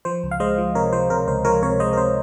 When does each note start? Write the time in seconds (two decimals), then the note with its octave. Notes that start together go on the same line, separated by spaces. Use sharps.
0.05 F3 C5
0.23 C#2
0.31 F5
0.40 G#3 C5 D#5
0.58 F3
0.75 C3 A#4 C#5
0.93 F3 C5
1.10 C3 A#4
1.27 C#2 C5
1.45 F3 A#4 C#5
1.63 C3 A#4 C#5
1.80 G#3 C5 D#5
1.93 A#4
1.97 C3 C5